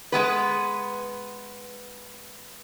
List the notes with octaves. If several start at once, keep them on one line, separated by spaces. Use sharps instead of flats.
G#3 B3 B4